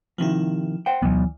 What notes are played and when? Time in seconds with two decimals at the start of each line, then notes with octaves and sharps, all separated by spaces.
0.18 D#2 C3 D#3 F3 E4
0.86 C5 F#5 G5
1.02 D2 E3 F#3 B3